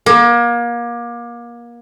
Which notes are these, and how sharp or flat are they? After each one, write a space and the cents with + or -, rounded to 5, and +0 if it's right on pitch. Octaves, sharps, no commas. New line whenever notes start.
A#3 +30